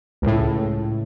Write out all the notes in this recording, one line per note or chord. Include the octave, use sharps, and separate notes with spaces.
C#2 A2